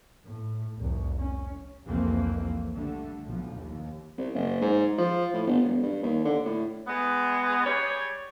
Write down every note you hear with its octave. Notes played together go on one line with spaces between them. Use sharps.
A2
F1 C2
C#4
F1 C2 F2 E3 A#3 C4
D3 G3 A3
B1 F3
D#2
C2
F#1
G#2
F3
A2
G1
E1
G2
D#2
D3
A2
G#3 B3
G3 G#4 C#5